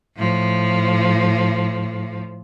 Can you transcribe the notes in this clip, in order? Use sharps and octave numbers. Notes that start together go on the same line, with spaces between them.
A2 F3